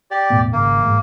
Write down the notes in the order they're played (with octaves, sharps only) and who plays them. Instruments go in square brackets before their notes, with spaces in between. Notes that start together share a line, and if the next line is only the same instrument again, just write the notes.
[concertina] G4 D5
[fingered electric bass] E1 A2 B3
[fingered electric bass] G#1 C#3 [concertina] A#3
[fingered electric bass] A1 G#2 G#3